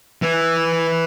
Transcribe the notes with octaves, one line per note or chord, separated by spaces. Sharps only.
E3